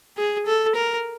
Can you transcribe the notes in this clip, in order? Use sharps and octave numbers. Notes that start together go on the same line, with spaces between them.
G#4
A4
A#4